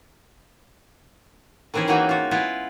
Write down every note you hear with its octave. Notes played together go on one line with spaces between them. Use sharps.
D#3 E3 C4 C#4 G#4
E3 F#3 A#3 D#4 F#4
F4 F#4
G#3 B3 E4 F4